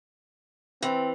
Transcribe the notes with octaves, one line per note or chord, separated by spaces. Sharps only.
E3 C4